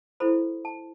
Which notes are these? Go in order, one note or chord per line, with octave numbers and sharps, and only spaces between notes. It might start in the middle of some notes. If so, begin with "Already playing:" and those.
E4 A4 C5 B5
A5